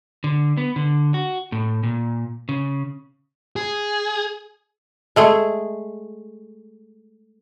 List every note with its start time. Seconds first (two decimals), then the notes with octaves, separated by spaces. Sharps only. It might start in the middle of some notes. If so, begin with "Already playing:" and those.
0.24 D3
0.57 B3
0.76 D3
1.14 F#4
1.52 A2
1.83 A#2
2.49 C#3
3.56 G#4
5.16 G#3 A3 G#4